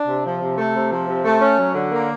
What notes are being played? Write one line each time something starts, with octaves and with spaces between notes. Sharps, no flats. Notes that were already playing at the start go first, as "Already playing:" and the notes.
Already playing: D4
C3
F3
C3
A3
C3
F3
C3
A3
C#4
F#3
D3
A#3